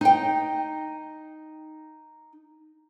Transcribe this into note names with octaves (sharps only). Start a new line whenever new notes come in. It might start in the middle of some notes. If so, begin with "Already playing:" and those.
D#4 G5